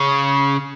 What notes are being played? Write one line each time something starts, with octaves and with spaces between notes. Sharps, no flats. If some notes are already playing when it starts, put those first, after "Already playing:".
Already playing: C#3